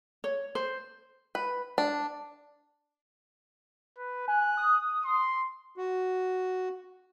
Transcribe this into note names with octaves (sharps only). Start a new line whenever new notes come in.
C#5
C5
B4
D4
B4
G#5 F#6
D#6
C6
F#4